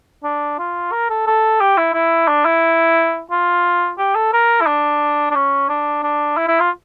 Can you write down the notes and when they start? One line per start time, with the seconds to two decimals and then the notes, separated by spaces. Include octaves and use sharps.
0.24 D4
0.59 F4
0.92 A#4
1.10 A4
1.27 A4
1.61 G4
1.77 E4
1.94 E4
2.28 D4
2.45 E4
3.31 F4
3.98 G4
4.15 A4
4.33 A#4
4.61 E4
4.67 D4
5.31 D4
5.35 C#4
5.69 D4
6.03 D4
6.37 E4
6.48 E4
6.60 F4